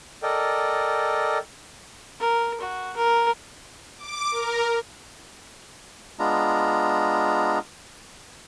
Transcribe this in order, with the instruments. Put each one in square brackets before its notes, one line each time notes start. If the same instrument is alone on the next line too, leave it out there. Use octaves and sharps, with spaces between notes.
[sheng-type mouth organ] A4 A#4 D5 D#5 G5
[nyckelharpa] A#4
F#4
A#4
[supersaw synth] D6
A#4
[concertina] G#3 B3 D4 F4 A#5